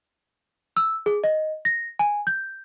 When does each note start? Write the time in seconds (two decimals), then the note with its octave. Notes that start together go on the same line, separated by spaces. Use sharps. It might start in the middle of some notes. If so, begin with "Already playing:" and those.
0.77 E6
1.06 G#4
1.24 D#5
1.65 A#6
1.99 G#5
2.27 G6